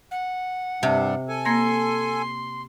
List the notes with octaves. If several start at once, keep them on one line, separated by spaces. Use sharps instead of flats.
F#5
G2 C3 G3 D4
A4 G#5
A#3 C6 G#6 A#6